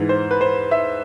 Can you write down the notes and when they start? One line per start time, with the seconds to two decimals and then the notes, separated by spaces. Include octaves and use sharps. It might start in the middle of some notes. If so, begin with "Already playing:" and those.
Already playing: G#2 E3
0.09 C5
0.31 B4
0.41 C5
0.71 E5